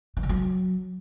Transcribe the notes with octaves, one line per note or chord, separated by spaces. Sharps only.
E3
D3
F#3